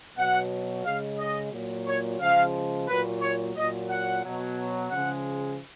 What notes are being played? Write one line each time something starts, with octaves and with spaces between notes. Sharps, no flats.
B2 F#3 F#5
C#3 G#3 F5
D#5
A#2 F#3
C#5
C#3 F3 G#3 F5
A#2 F#3 B4
C#5
A#2 F#3 D#5
F#5
B2 F#3
C#3 F3 G#3 F#5